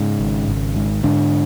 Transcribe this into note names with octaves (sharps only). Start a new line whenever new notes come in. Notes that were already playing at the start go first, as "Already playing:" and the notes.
Already playing: G#2 C#3 C#4
G#1
G#1
G#2
G#2 D3 D4